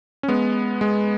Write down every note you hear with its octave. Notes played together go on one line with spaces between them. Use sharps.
C#4
G#3 B3
G#3